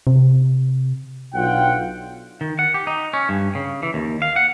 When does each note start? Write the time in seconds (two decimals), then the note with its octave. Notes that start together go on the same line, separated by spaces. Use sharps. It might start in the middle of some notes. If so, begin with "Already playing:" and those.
0.07 C3
1.35 B1 D4 F4 F#5 G5
2.41 D#3
2.59 F#5
2.74 G4
2.87 D#4
3.13 C#4
3.29 G2
3.55 C#3
3.83 E3
3.94 D#2
4.22 F5
4.36 F#5